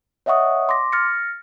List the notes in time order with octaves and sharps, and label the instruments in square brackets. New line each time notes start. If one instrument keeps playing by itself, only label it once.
[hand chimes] C#5 D#5 E5 F#5 C#6 D#6
C6 D6 A#6
F6 A6 A#6 C#7